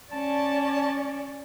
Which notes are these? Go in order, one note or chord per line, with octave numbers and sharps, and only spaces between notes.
C#4 D5 A5